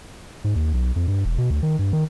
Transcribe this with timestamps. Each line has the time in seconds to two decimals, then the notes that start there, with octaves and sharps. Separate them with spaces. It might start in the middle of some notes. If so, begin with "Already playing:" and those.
0.44 G#2
0.56 D#2
0.74 B1
0.96 F2
1.08 G2
1.25 E1
1.38 B2
1.50 D2
1.63 D#3
1.79 G2
1.93 D#3